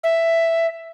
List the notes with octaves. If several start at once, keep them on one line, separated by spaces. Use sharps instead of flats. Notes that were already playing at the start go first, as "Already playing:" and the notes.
E5